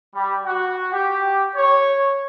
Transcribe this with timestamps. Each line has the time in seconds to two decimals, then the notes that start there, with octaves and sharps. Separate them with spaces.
0.14 G3
0.44 F#4
0.92 G4
1.55 C#5